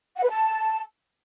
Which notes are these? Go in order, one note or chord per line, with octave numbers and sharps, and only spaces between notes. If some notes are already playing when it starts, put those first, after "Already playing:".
F#5
B4
A5